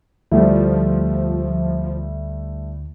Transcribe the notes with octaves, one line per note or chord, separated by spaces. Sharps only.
D2 F3 G3 A3 E4